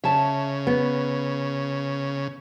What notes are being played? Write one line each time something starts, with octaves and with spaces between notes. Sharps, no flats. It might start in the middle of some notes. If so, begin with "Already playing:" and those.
C#3 E5 A5
B3